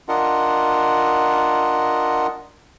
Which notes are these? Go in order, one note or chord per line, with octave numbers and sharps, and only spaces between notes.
D4 F4 A#4 D#5 F#5